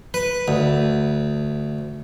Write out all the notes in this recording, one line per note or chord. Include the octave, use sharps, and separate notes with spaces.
B4
D2